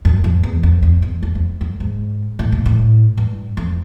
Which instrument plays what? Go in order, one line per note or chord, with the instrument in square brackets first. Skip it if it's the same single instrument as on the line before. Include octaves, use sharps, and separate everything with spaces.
[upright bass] F#2
F2
E2
F2
F2
E2
F2
F2
F#2
G#2
A2
A#2
A2
G2
F2